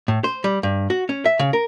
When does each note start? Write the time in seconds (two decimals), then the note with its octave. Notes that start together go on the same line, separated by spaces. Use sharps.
0.08 A2
0.24 C5
0.44 G3
0.63 G2
0.90 F#4
1.09 C#4
1.26 E5
1.39 C#3
1.53 A#4